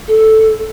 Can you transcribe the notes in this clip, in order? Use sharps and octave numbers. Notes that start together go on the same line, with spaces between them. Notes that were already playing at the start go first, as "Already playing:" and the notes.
A4